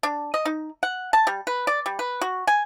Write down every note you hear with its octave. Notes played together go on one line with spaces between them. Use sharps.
D4
D#5
D#4
F#5
A5
G3
B4
D5
G3
B4
F#4
G#5